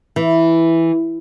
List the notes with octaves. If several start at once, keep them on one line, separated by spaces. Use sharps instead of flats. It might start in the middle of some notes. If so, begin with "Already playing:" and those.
E3